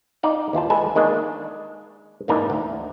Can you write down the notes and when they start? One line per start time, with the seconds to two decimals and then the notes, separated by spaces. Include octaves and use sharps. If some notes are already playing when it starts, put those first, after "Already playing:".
0.23 D#4 D5 F5
0.53 D#2 E3 F4 A5
0.70 G#3 A4 B4 G#5
0.96 D#3 G#3 A#3 D4
2.28 G#2 E3 A#3 D4 D#4
2.50 D2